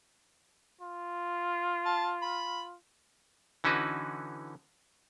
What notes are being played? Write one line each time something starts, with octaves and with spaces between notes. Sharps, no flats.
F4
A5
B5
D3 E3 C#4 D#4 F#4 B4